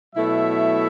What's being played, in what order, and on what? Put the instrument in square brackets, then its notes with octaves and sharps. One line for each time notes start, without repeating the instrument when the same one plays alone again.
[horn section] B2 F#3 A3 E4 E5